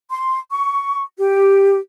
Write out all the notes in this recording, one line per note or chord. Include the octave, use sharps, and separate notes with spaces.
C6
C#6
G4